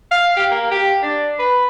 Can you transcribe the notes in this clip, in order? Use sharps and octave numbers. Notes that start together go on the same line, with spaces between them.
F5
G4
A#3
G4
D4
B4